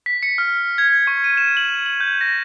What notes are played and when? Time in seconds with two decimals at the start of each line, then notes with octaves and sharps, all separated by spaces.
0.06 B6
0.23 C#7
0.38 F6
0.78 G#6
1.07 C#6
1.24 D#7
1.37 E7
1.57 F#7
1.86 F#7
2.00 G6
2.21 A#6